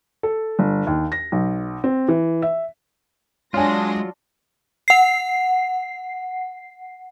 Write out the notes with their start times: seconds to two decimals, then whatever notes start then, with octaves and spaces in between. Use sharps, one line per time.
0.23 A4
0.59 G1
0.87 D#2
1.12 A#6
1.32 B1
1.84 C4
2.09 E3
2.42 E5
3.54 F#3 G#3 D4 F4 C#5 G#5 C6 A#6
4.88 F#5 C7